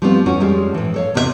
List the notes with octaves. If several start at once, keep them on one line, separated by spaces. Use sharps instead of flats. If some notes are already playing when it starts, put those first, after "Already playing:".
F3 G3 A3 B3 C4 F4
F2 E3 C#4 F#4
F2 F3 G3 G#3 C#4
A2 E3
A4 C#5 F5
E2 C3 B3 G4 E5